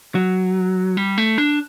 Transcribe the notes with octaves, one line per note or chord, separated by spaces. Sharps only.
F#3
G3
A3
D4